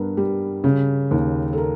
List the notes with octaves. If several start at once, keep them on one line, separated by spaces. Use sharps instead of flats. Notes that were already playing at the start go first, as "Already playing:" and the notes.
Already playing: G2 B3 A#4
G3
C#3
D#2
A4
A#4